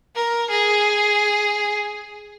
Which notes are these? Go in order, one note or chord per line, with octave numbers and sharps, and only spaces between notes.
A#4
G#4